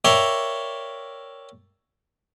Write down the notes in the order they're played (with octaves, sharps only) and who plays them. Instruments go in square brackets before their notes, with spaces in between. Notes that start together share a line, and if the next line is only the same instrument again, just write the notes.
[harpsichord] A#4 C#5 D5 E5 F5 G5